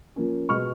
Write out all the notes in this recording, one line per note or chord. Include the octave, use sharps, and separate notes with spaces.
F3 A#3 C#4
B2 G#3 B3 C#6 F6